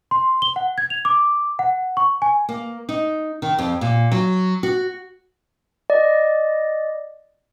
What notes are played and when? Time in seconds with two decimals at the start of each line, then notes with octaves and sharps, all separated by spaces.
0.11 C6
0.42 G7
0.56 F#5
0.78 G#6
0.90 F7
1.05 D6
1.59 F#5
1.97 C#6
2.22 G#5
2.49 A#3
2.89 D#4
3.42 D#3
3.58 F2
3.81 A#2
4.12 F#3
4.63 F#4
5.90 D5 D#5